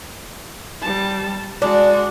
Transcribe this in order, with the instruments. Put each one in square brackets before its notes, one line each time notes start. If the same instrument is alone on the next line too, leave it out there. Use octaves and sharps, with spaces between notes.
[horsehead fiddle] G3 A5
[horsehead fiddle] G#3 F#4 [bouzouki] D4